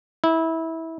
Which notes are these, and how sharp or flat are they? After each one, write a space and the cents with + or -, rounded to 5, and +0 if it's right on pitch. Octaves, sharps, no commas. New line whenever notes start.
E4 -20